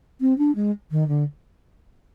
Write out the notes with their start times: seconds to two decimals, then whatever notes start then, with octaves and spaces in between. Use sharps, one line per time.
0.21 C4
0.38 D4
0.55 G#3
0.91 D#3
1.08 D3